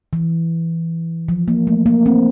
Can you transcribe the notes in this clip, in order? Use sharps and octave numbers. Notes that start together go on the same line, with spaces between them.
E3
F3
A#3
A3
A#3
C4